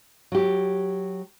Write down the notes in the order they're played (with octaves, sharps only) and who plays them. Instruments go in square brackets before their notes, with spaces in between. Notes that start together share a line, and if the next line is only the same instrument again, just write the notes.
[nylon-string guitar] F#3 G4